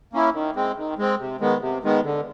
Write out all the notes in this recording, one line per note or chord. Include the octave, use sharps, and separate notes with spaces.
A#3 C#4 E4
D#3
G#3 C4
D#3
G#3 C4
C3
D#3 G#3 B3
C3
D#3 G#3 B3
D3